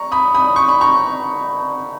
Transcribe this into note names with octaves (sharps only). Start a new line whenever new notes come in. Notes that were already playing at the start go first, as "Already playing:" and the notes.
Already playing: A#5 C#6
B5 D#6
B5 D#6
C#6
B5
A#5 C#6